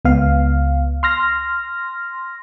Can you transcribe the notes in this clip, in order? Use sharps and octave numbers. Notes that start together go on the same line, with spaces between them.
C#2 B3 F5
C6 F6 A#6